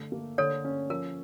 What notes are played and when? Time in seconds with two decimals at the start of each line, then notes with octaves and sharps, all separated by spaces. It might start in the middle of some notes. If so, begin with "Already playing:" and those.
Already playing: D3 A3
0.12 A#3
0.38 D3 A4 C#5
0.64 C#4
0.90 F3 A#4